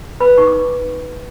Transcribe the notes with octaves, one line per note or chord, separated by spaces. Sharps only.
B4 B5
D#4 C#6
D6